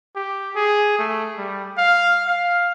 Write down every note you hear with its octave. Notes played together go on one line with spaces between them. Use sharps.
G4
G#4
A3
G3
F5
F5